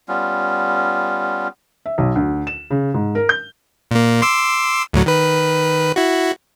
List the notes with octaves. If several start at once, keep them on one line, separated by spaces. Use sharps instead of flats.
G3 B3 C#4 F4
E5
B1
D2
E7
C#3
G#2
A#4
G6
A#2 A#3
C6 D6 E6
D2 A2 F#3
D#3 B4
E4 F#4